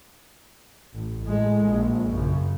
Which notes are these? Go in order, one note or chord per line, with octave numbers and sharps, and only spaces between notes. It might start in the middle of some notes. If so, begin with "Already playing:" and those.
A1
A2 G#3
A#1
F#2 C#3